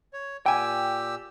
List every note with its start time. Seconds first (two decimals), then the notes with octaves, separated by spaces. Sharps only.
0.13 C#5
0.46 A#2 G4 G5 G#5 E6